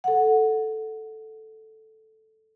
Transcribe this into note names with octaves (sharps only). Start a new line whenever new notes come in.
A4 F#5